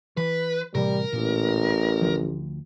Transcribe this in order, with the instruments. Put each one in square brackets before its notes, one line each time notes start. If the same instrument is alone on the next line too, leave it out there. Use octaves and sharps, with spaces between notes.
[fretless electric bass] E3 [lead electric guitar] B4
[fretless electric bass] A2 C3 E3 [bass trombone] G3 [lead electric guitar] A#4
[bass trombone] A1 [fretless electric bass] A#2
[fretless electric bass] D2 F3